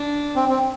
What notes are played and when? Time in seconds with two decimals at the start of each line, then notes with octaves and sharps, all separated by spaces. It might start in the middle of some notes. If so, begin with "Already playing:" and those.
Already playing: D4
0.36 C4
0.50 C4